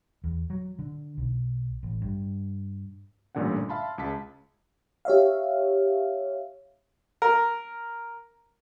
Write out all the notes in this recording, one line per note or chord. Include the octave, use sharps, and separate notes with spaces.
E2
F#3
D3
B1
A1
G2
A1 G2 A#2 D3 C#4 F#5
E5 F5 A5 B5 C6
C#2 C#3 A5 B6
G4 C#5 E5 F5
A#4